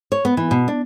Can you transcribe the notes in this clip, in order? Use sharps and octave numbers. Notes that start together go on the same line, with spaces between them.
C#5
B3
E3
B2
D4